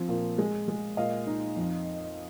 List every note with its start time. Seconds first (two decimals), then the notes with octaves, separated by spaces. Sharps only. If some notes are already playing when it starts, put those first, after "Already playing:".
Already playing: F3 C4
0.08 A#2
0.38 G#3
0.68 G#3
0.97 A#2 D#5 F5
1.27 D#4
1.56 F2